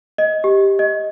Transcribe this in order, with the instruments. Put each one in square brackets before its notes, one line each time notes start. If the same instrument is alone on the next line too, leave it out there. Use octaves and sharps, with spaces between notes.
[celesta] D#5
G4
D#5